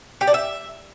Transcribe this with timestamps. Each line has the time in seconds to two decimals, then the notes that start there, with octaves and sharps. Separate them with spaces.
0.21 G4
0.27 D4
0.34 E5